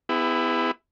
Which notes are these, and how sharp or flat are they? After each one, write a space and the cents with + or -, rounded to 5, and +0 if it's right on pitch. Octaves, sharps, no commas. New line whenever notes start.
B3 +25 E4 +0 G#4 -35